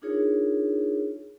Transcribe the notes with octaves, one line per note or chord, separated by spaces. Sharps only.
D4 D#4 F4 G#4 A#4 C#5